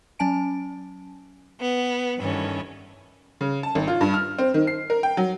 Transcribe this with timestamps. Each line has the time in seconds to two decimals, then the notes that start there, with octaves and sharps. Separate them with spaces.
0.19 F#3 C#4 G#5 A5 D7
1.59 B3
2.18 G2 D#3 E3 C#4 A4
3.41 C#3
3.63 A5
3.75 G#1
3.88 F4
4.01 G2
4.14 F6
4.38 C4
4.54 D#3
4.67 C7
4.90 A#4
5.03 G5
5.17 F#3